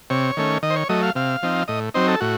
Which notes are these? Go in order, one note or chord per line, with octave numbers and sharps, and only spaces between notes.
C3 C#5
D#3 A3 C#4
D#3 D#5
C5
C#5
F#3 A3 D#5
F5
C3 F5
F3 C4 D#4
A2 D#5
F#3 C4 D#4 C5
A4
A2 F#4